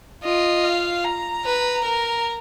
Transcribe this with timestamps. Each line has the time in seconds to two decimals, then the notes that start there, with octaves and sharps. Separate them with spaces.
0.24 F4 D#5
0.64 F5
1.05 A#5
1.45 B4
1.85 A#4